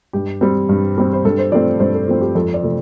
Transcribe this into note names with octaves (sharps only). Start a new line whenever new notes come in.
G2 G4
G3 C4
G2
G3 C4
C5
G2 A4
C5
F3 A3 C4 D5
G2 C5
A4
F3 A3 C4
G4
F2 A4
D5
C3 F3 A3